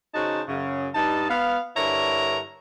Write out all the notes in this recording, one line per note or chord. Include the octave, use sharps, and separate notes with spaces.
C#3 D#4 F#4 C5 D#5 A5
F#2 C#3
G2 D#4 A5
B3 F5
G2 D3 E4 A#4 C#5 A#5